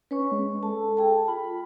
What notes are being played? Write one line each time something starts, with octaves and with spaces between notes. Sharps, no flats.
C#4 B4 C#5 C#6
G#3
A4 A5
G#4 G5 A5
F4 B5